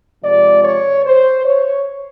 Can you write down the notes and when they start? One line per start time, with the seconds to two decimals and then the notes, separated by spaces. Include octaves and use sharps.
0.24 C3 F3 G#3 D5
0.64 C#5
1.04 C5
1.45 C#5